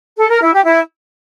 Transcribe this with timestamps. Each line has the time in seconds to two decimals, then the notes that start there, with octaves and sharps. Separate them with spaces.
0.17 A4
0.29 A#4
0.41 E4
0.53 G4
0.65 E4